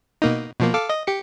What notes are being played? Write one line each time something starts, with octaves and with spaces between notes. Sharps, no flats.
B2 A#3 D#4
B2 F3 A#3
A4 F5 D6
D#5
G4 C#7